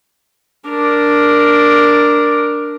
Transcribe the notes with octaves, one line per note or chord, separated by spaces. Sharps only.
D4 A#4